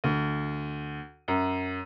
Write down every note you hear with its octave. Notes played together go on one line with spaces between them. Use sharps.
D2
F#2